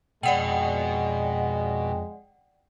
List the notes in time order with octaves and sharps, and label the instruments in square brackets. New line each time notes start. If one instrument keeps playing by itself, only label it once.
[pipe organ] F2 [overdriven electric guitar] B2 [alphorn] G#3 [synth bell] D5 F#5 G5